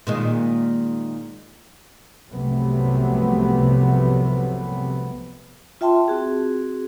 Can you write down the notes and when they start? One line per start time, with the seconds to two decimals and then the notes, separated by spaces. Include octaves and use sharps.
0.07 A#2 D#3 G#3
2.31 C2 C3 F3 F#3 A3 B3
5.81 F4 E5 G5 A5 C6
6.08 C4 F#4 G#4